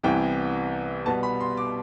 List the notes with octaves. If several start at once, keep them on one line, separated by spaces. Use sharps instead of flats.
C2 C3 E3 B3 G5
B2 G3 B3 A5
B5
C6
D6